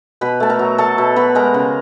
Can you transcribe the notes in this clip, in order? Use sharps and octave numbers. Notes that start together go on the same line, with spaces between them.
B2 B4 B5
A3 A5
A#4 A#5
F#3
A3 A4 A5
B2
B2 B4 B5
G#3 A#4 A#5
C#3